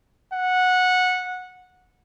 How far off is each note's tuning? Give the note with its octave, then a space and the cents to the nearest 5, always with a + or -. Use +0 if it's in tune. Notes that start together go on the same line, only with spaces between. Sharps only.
F#5 -15